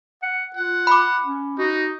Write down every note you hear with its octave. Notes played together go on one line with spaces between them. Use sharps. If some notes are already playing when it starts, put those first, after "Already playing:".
F#5
F4 F#5
B5 D6
C#4
D#4 F#4